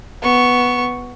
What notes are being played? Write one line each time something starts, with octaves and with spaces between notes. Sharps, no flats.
B3 C#6